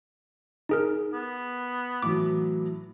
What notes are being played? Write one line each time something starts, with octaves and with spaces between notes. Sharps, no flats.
D#4 G#4 A#4
B3
A2 E3 F#3 D6